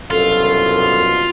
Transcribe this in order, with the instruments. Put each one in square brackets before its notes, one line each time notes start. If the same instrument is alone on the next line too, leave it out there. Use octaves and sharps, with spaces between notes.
[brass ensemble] C2 F#2 B2 [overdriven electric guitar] F4 [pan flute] A4